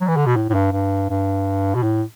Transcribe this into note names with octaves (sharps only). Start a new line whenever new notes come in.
F#3
E3
D3
B2
A2
A2
G2
G2
G2
B2
A2